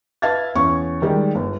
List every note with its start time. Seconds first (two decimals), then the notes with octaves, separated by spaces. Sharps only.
0.22 B4 E5 F5 A5 G#6 A6
0.55 E2 C#4 C#6
1.02 D#3 G3 G#3
1.35 G1